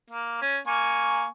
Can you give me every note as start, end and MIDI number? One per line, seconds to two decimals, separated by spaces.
0.10 0.39 58
0.42 0.58 61
0.67 1.25 58
0.67 1.25 80
0.67 1.25 85